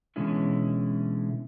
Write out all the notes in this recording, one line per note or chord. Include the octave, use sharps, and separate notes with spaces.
B2 D3 E3 G#3 C#4 E4